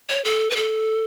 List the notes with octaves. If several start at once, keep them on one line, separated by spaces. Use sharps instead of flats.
C#5
A4
B4
A4